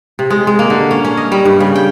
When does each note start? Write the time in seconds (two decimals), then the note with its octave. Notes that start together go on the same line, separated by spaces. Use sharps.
0.19 C3
0.30 G#3
0.47 G#3
0.59 A#3
0.70 D3
0.91 C#4
1.05 C#4
1.17 D#5
1.32 G3
1.45 G2
1.60 C#3
1.76 G5